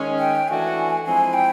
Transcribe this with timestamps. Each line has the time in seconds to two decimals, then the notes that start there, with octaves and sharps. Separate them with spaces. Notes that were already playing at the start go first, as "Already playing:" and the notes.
Already playing: D#3 G#3 C#4
0.19 G5
0.48 E3 A3 D4 F#4 A4 G#5
1.05 F3 G#3 C4 E4 G#5
1.34 G5